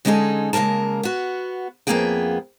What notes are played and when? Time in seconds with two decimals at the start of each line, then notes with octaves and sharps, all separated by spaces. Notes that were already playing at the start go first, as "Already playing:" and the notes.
0.05 D3 G#3 C#4 D#4 G#4 A4
0.53 C#3 G#3 A#3 A#4 A5
1.03 B3 F#4
1.87 F2 D#3 A#3 B3 G#4 G5